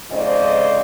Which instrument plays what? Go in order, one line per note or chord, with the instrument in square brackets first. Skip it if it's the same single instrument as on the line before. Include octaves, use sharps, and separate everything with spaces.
[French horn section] F2 G#2 C#3 C5 D5 D#5